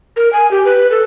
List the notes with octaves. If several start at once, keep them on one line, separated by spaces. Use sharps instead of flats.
A#4
G#5
G4
B4
A4